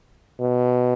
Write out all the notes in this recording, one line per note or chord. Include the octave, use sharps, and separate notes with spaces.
B2